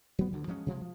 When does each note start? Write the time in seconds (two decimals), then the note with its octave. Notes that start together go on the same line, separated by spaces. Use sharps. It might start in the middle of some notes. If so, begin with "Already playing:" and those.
0.19 F#3 B3
0.33 D2 D3
0.48 F3 F#3 G#3 C#4
0.66 C3 F3 G#3
0.81 F3